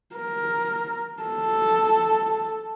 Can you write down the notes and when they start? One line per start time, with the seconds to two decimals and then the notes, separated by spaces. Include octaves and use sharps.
0.16 A#4
1.22 A4